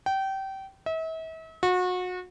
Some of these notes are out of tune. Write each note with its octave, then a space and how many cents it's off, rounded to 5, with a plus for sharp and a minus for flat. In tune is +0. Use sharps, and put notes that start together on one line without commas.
G5 -25
E5 -40
F#4 -30